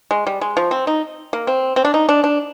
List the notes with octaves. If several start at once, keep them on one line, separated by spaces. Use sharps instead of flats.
G#3
G3
G#3
F3
C4
D#4
A#3
C4
C4
D4
D#4
D4
D4